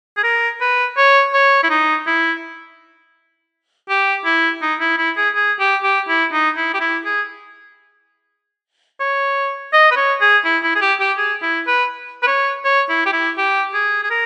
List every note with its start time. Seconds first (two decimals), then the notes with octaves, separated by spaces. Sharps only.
0.17 G#4
0.24 A#4
0.61 B4
0.97 C#5
1.33 C#5
1.63 E4
1.70 D#4
2.07 E4
3.89 G4
4.25 E4
4.62 D#4
4.80 E4
4.98 E4
5.17 G#4
5.35 G#4
5.60 G4
5.83 G4
6.08 E4
6.33 D#4
6.57 E4
6.74 G4
6.80 E4
7.05 G#4
9.00 C#5
9.73 D#5
9.91 B4
9.96 C#5
10.21 G#4
10.45 E4
10.63 E4
10.75 G#4
10.81 G4
11.00 G4
11.18 G#4
11.42 E4
11.67 B4
12.23 B4
12.27 C#5
12.65 C#5
12.89 E4
13.06 G4
13.13 E4
13.38 G4
13.74 G#4
14.03 G#4
14.10 A#4